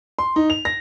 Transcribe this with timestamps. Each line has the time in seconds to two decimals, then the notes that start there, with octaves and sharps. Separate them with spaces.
0.19 C6
0.36 D#4
0.50 F7
0.65 A#6